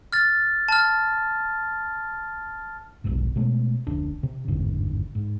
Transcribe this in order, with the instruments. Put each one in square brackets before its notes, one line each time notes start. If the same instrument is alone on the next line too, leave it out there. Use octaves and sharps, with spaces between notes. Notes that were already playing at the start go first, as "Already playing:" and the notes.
[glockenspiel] F6 A6
A5 F6
[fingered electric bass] F1 B1 G#2 C3
B2 G#3 A3
F1 D2 D4
C3
G1 E2 G#2 D3
G#2